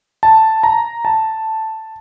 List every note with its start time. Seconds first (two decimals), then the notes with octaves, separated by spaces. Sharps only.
0.23 A5
0.63 A#5
1.05 A5